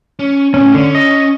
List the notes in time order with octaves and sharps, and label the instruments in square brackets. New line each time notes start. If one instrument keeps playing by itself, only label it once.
[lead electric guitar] C#4
[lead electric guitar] A2 C#3 [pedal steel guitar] C#4
[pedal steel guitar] D3 [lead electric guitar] C#4
[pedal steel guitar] D#5